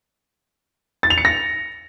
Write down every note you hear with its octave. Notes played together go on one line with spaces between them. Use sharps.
A6
F7
C#7
A#6